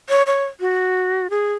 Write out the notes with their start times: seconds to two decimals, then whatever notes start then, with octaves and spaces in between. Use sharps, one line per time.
0.09 C#5
0.27 C#5
0.60 F#4
1.30 G#4